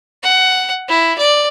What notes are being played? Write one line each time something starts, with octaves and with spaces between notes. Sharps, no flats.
F#5
E4
D5